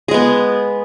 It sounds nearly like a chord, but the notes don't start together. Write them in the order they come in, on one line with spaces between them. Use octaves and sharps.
G#4 G#3 B3